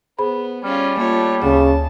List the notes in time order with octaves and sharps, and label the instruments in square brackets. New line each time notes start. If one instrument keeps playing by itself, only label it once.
[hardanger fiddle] B3 [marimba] G#4 C5 B5
[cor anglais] G3 [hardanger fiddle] C#4 F4 [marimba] F6
[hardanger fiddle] A3 C#5 [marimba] A#3 F4
[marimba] D2 [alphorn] C#3 [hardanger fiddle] A5